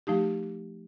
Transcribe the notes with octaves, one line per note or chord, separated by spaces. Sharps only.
F3 A3 D#4 G4